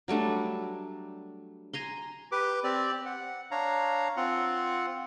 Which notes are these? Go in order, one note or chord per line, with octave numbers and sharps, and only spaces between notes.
F#3 G3 A3 D4
G#5 A#5 C6
G4 B4 D6
C4 G4 D5
F#5
D4 C#5 F5 A#5
C4 F4 F#5